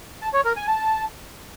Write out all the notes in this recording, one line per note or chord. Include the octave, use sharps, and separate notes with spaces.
A5
C#5
A#4
G#5
A5